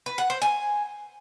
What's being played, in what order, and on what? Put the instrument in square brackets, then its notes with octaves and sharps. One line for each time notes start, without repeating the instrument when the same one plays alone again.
[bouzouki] B4
F#5
C5
G#5